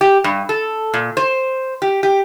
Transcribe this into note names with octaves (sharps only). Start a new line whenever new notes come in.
G4
G2
A4
A#2
C5
G4
G4